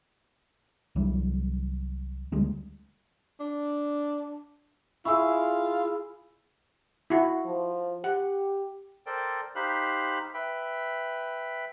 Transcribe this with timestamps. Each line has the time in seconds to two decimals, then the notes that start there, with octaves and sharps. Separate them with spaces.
0.96 C2 E3 F#3 G3
2.32 D2 G3 G#3 A#3
3.40 D4
5.05 E4 F4 G#4 C#6 E6
7.10 E4 F#4
7.45 F3
8.04 G4 F#5
9.06 A4 A#4 C5 D5 G5
9.55 D#4 G4 C5 F5 B5 F#6
10.34 B4 E5 G5 B5